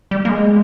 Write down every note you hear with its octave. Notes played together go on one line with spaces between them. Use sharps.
G3
A#3
G#3